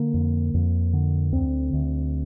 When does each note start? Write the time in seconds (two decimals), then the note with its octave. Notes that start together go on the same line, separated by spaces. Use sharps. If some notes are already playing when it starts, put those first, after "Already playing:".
Already playing: D3 A#3
0.14 F2
0.54 F2
0.93 D3
1.33 D2 C4
1.73 D2